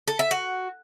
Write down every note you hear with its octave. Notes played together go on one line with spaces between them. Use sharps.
A4
E5
F#4